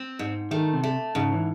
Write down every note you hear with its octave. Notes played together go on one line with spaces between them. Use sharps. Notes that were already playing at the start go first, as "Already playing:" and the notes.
Already playing: C4
G#2
D#3 A3
C3
A3
G#2 C#3
E3